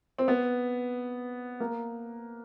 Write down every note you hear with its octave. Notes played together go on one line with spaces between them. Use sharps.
C4
B3
A#3